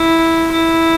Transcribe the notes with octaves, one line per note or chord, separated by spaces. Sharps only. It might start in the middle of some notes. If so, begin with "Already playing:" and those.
Already playing: E4
E4